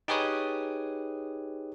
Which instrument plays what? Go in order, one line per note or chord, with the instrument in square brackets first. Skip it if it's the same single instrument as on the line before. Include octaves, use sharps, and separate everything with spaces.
[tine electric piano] D#4 G4 G#4 B4 C#5 D#6